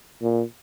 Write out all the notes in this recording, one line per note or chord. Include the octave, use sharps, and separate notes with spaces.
A#2